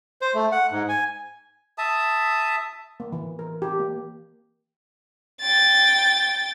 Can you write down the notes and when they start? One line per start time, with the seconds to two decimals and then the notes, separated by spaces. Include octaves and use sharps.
0.21 C5
0.34 A3
0.52 F#5
0.71 G#2
0.89 G#5
1.78 E5 A5 D#6
3.00 A#3
3.12 E3
3.39 A#4
3.62 G4
3.79 A#3
5.41 G5 A6